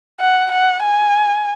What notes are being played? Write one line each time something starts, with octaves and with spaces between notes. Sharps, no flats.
F#5
F#5
G#5